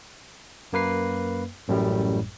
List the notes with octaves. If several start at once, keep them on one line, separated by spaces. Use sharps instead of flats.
F#2 A#3 B4 C7
A1 F#2 A2 G3